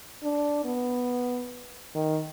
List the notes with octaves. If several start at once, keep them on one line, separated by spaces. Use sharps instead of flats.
D4
B3
D#3